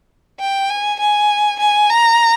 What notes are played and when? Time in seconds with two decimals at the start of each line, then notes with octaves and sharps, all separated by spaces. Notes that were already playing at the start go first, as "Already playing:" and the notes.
0.40 G5
0.70 G#5
1.00 G#5
1.60 G#5
1.90 A#5